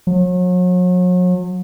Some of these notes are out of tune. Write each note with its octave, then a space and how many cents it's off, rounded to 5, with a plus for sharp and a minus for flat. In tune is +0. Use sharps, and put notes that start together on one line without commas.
F#3 -40